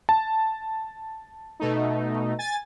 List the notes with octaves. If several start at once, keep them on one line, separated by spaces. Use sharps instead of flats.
A5
B2 A3 D#4
G#5 A6